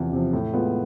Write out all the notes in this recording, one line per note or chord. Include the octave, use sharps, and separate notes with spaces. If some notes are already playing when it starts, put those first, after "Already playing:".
Already playing: E2 C3 F3
C3 F3
A2
G#3 B3 F4